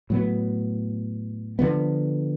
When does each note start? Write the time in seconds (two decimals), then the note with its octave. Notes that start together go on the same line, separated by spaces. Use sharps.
0.10 A2 F#3 B3
1.59 D3 F3 B3